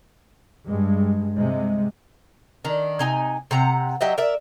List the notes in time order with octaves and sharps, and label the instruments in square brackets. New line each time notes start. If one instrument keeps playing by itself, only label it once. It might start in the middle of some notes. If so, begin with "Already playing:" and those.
[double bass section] G2 G#3
C3 G#3
[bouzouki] D#3 D4
C3 D#4 G#5
C3 F#5 A#5
F#3 G4 D#5 E5
A#4 D5 E5